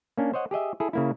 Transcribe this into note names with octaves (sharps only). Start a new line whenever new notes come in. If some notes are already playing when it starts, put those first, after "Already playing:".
A#3 C#4 D4
C5 C#5 D#5 F#5
G4 G#4 D#5 E5
E4 G#4 A4
C#3 A#3 E4